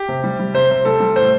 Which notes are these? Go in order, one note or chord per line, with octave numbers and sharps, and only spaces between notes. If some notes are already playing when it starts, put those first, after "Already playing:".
Already playing: G4
C3
G3
G3
C3 C5
C3
G3 A4
G3
A2 C5